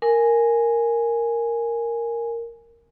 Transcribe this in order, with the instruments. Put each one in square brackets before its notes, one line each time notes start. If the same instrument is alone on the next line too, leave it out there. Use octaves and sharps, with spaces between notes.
[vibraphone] A#4 G#5